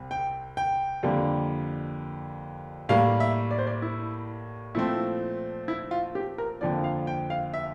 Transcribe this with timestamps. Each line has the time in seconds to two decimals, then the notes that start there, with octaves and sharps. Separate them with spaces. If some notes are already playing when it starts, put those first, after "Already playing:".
Already playing: C2 C3
0.11 G5
0.57 G5
1.03 F2 D3 G3 A#3
2.89 A2 G3 A#3 F5
3.20 E5
3.51 D5
3.59 C5
3.67 D5
3.82 E4
4.75 A#2 F3 A3 C4 E4
5.68 E4
5.91 F4
6.15 G4
6.38 A#4
6.61 F2 D3 F3 A#3 D5
6.84 F5
7.07 G5
7.30 F5
7.54 E5